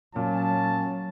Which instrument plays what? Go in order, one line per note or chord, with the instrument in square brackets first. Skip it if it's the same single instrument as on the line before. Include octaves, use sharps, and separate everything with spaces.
[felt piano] A#2 [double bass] F#3 [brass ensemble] C#4 A5